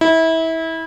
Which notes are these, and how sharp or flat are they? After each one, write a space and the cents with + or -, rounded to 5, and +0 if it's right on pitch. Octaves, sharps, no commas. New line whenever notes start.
E4 -25